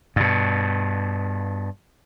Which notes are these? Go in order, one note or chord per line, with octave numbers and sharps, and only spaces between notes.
G2 B2